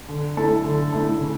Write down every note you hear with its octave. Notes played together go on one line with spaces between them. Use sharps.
D3
A3 E4 A4
D3
A3 E4 A4
C#3